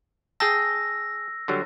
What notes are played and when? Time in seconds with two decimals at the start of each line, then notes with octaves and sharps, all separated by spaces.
0.40 G#4 G5 A5 E6 A#6
1.48 D3 F#3 G3